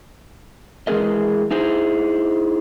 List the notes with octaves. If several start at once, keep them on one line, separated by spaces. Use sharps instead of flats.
E3 G#3 A3 G#4 A#4 D#5
D#4 E4 G#4 C5